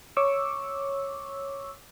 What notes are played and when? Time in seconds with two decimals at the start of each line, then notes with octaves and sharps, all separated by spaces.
0.17 C#5 C#6 D6 E6